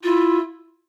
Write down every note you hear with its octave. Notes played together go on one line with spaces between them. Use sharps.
E4 F4